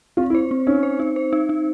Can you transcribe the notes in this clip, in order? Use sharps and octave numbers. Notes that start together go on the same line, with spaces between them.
C4 F4
E4
C5
C4
C#4 D#4
C5
D#4
C5
D#4
D#4